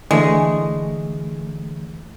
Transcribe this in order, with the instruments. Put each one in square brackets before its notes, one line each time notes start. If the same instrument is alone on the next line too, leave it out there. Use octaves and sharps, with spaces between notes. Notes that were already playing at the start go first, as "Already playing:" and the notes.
[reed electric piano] D3 E3 A3 [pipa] G#3